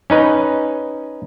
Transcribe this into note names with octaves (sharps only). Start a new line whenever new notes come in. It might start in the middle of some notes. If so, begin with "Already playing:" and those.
C#4 D#4 B4